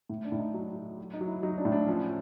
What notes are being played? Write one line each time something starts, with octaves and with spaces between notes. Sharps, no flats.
A2
D4
A2
D#4
F#3
F#3
F#3
D#4
F#3
E4
F#3 D#4
D4
A2
D4
F3 C#4